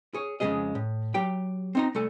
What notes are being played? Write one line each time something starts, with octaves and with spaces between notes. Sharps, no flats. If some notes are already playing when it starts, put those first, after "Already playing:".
G#4 C#5
F2 C#3 F#3 G#3 G#4 D#5
A2
F#3 G4 G5
C4 D#4 A#5
C2 A3 A4 G#5